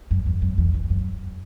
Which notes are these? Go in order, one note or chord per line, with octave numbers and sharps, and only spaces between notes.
F#2
E2
F#2
E2
E2
F#2